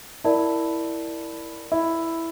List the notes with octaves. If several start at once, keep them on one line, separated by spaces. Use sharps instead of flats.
E4 A#4 D5 A5
E4